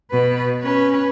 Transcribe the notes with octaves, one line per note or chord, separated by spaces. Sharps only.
B2 B4
C#4 B4